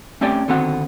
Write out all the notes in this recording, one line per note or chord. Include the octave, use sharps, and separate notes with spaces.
A3 C4 C#4 G4 D5 G#5
D3 D#3 B3 C4 F#4 F#5